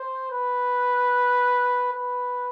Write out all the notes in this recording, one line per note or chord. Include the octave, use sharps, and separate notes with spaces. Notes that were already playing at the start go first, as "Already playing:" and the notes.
Already playing: C5
B4
B4